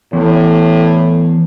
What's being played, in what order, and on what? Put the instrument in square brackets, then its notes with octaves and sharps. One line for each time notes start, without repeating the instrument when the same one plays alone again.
[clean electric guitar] E2 [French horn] A2